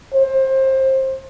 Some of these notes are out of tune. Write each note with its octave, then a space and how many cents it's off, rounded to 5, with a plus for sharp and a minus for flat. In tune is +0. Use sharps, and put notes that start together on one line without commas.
C5 +25